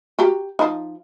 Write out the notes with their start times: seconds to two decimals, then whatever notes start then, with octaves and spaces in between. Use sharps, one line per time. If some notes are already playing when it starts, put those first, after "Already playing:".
0.19 F#4 G4 A#5
0.59 F3 D#4